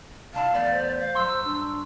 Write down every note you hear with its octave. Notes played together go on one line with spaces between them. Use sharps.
C2 D4 E4 F5 A5
E2 A3 B3 D5
C5
F5
G2 F#3 C6 E6
D4